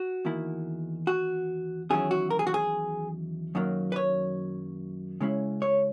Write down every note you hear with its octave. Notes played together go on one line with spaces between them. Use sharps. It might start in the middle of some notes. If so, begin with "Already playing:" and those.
Already playing: F#4
E2 D#3 A#3 E4
F#4
E2 D#3 F#3 C#4 E4 G#4
F#4
A#4
G#4
F#4
G#4
F#2 D#3 F#3 A#3
B4
C#5
C#3 G#3 C#4 E4
C#5